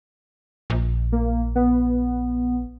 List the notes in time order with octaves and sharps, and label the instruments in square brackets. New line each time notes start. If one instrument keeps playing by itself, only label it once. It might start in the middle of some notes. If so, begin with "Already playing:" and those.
[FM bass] A#1
[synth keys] A#3
B3